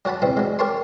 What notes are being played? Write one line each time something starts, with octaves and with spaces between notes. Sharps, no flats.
F#3 C#5 F#5 A5 B5
C#3 E3 G3 C4
F#3 G#3
G4 A#4 C#5 A5 C6